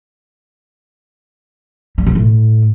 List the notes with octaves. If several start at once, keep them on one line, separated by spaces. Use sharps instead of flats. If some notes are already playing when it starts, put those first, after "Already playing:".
G3
B2
A2